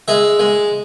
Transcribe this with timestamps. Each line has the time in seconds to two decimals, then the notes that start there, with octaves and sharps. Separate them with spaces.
0.08 G#3 E5
0.39 G#3